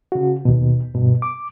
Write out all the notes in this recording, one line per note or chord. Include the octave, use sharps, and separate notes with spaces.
C#3 F#4
D#2 B2
G2 B2
D6